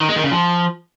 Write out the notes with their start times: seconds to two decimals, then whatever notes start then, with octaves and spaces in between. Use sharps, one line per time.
0.01 D#3
0.09 G#3
0.16 D#3
0.24 C#3
0.32 F3